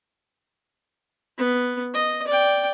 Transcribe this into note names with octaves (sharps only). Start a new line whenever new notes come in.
B3
D#5
D5 G5